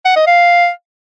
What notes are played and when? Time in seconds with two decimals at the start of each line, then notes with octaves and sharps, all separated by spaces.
0.05 F#5
0.16 D#5
0.27 F5